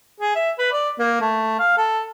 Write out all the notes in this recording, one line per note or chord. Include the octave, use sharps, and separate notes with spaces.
G#4
E5
B4
D5
A#3
A3
F5
A4